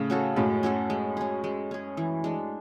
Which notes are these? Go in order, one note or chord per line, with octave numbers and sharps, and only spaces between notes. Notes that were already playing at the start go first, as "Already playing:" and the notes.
Already playing: A2 C#3
C#4 F#4 A4
F#2 A2 G#3
C#4 F#4 A4
G#3
C#4 G#4
G#3
C#4 G#4
E3
G#3 D4